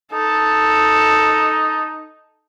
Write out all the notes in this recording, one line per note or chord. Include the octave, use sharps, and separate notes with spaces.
D#4 A4